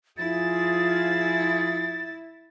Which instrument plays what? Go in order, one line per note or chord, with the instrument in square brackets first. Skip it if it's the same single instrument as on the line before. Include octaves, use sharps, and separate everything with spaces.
[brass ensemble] F3 F4 G#4 [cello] E4 [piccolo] A6